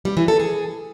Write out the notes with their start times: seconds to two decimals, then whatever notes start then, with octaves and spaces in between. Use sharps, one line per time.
0.05 G3
0.17 E3
0.28 A4
0.40 G#4